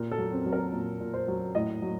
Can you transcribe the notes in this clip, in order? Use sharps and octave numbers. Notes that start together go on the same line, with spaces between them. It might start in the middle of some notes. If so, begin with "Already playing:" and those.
Already playing: A#2 A#4
A4
F#3
C4
F#3
A#4
A#2
A#2
C5
F#3
A2 D#5
F#3